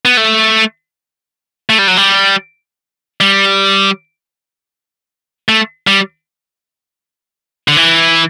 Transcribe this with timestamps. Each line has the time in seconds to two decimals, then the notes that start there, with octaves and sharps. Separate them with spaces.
0.05 B3
0.17 A3
1.69 A3
1.78 G3
1.88 F#3
1.97 G3
3.21 G3
5.49 A3
5.87 G3
7.68 D3
7.77 E3